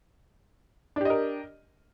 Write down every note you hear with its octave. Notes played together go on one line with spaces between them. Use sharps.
D4 G4 A#4 D#5